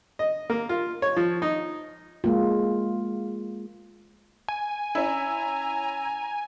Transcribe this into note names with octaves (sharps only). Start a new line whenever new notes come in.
D#5
A#3
F4
C#5
F3
D#4
G#3 A#3 F4
G#5
C#4 E4 A#5